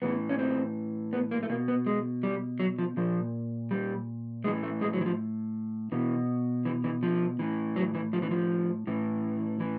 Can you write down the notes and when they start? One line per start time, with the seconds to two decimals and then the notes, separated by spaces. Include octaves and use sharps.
0.02 A2 E3 B3
0.29 C#4
0.39 C4
1.13 B3
1.31 A#3
1.43 A3
1.49 B2 A#3
1.68 B3
1.86 G#3
2.23 G3
2.60 F#3
2.78 F3
2.97 A#2 F3
3.71 G3
4.44 A2 E3 G#3
4.63 A3
4.81 G#3
4.93 F#3
5.01 E3
5.06 F3
5.92 B2 E3
6.65 E3
6.84 E3
7.03 F3
7.39 A2 E3
7.76 F#3
7.95 E3
8.13 F3
8.22 E3
8.31 F3
8.87 A2 E3
9.60 E3